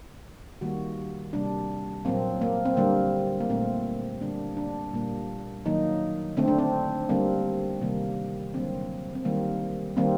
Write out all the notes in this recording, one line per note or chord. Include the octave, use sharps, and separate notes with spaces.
D#3 G3 A#3 F#4
C3 G3 A#3 D4
A#2 F#3 A#3 C4
A#3
C4
D3 G3 A#3
A#3
A#2 A3 C4
D3 G3 A#3 D4
D4
A#2 G3 A#3
D#3 F#3 A#3 D#4
D3 A3 C4
D4
C4
D3 G3 A#3 C4
C3 D#3 G3 A#3
D3 F#3 A#3 C4
C4
D#3 G3 A#3
D#3 G3 A#3 C4